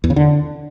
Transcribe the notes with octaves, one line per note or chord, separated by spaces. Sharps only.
E2
C#3
D3